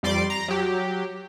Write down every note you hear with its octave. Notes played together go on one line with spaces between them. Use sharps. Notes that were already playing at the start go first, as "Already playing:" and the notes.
F2 G3 D5 C6 D6
A#5
F#3 G4